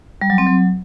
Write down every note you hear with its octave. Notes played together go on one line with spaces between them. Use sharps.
G3
F#3
C4
F#3